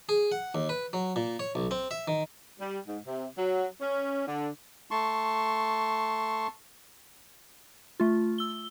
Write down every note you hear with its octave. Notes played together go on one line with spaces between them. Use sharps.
G#4
F#5
D#2
B4
F#3
A#2
C#5
B1
C4
E5
D#3
G3
G#2
C3
F#3
C#4
D3
A3 A5 C6 C#6
A3 F4
E6 G7